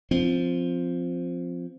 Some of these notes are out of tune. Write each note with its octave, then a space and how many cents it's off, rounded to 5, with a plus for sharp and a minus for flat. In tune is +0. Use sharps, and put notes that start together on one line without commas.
F3 +0 C4 +0